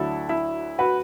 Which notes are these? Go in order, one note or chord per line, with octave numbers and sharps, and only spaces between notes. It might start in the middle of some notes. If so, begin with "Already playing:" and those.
Already playing: D2 D3 F#3 E4 A4
E4
F#4 B4